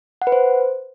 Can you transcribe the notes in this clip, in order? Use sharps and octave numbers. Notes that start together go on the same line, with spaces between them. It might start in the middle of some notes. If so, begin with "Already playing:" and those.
F#5
B4
C5